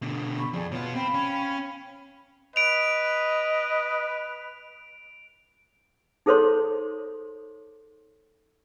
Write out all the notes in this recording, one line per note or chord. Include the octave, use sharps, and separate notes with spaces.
B2 D3
B5 C#6
F2 G#4 D5
B2 B3 F4 C#5
C4 F5 G5 B5
C#4
B4 D#5 D7 F7
D#4 G#4 A4 C5 C#5 C6